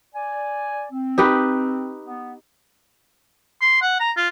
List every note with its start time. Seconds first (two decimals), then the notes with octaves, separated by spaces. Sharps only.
0.15 D5 G#5
0.92 C4
1.18 D#4 G4 B4
2.07 B3
3.61 C6
3.81 F#5
4.00 A#5
4.17 F4